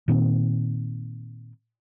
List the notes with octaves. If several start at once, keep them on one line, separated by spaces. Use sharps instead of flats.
A#2 D#3 A#3 C4